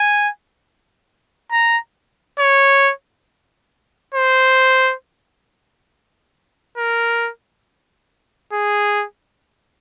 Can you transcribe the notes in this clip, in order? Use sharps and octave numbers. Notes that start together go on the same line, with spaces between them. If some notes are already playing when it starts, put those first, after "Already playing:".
Already playing: G#5
A#5
C#5
C5
A#4
G#4